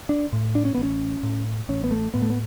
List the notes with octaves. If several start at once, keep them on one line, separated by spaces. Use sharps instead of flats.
D4
A2
D4
C#4
B3
A1
C#4
A2
A1 C#4
B3
A3
A2 B3
A3
B3